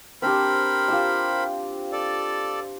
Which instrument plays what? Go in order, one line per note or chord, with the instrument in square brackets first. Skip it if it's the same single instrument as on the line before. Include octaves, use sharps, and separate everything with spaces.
[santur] C4 D4 G4 [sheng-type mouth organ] A#4 C5 B5
[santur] F4 G4 E6
[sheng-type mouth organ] A4 D5